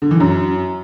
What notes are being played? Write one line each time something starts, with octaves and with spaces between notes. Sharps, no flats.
D3
E3
F#2